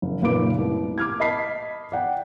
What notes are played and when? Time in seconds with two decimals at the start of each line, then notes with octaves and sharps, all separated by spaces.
0.02 F#1
0.22 F#1 A#2 D#4 B4 D6 D7
0.58 C2 A2
0.98 D6 F6 G#6
1.20 D#5 A5 B5 B6 C7
1.92 D5 F#5 G5